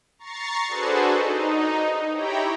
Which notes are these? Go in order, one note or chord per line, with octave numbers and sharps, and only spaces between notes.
A#5 C#6 A6 C7
D4 F#4 G#4 A4 B4 C5
D#4
E4 G4 C#5 G5 A#5 B5